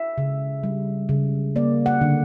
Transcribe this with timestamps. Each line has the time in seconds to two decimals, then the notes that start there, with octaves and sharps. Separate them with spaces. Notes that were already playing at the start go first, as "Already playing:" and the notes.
Already playing: E5
0.18 C#3
0.63 G3
1.09 C#3
1.56 A#3 D5
1.86 F#5
2.01 D3